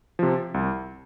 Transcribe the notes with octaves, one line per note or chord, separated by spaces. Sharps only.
C3 F3
C2